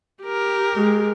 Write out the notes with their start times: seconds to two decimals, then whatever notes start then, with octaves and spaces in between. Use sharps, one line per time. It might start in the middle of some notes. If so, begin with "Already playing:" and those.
0.24 G4 A#4
0.75 G#3